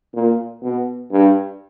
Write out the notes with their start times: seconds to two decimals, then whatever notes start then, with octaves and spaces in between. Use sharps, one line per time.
0.14 A#2
0.62 B2
1.11 G2